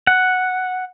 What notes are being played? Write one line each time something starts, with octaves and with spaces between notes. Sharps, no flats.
F#5